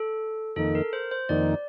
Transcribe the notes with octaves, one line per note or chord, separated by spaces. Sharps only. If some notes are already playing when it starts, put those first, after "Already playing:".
Already playing: A4
F2 D#3 A#3 D#4 A4
A#4
C5
C5
F2 D#3 A#3 D#4 D5